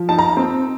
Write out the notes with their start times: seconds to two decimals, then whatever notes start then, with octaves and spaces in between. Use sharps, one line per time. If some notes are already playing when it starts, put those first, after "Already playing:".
Already playing: F3
0.09 D#4 A5
0.18 A#5
0.37 C4